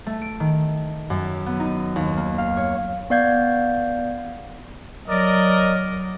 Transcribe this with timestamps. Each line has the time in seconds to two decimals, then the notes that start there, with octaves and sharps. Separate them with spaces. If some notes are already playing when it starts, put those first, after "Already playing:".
0.06 A3
0.22 D7
0.40 D#3
1.10 F#2
1.46 B3
1.60 D#4
1.96 D#2
2.17 A#3
2.38 F5
2.57 C#5
3.10 B3 D5 F5 G6 G#6
5.08 F#3 A#4 D5 D#5